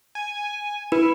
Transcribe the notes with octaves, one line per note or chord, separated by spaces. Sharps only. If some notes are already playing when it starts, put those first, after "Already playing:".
G#5
E4 B4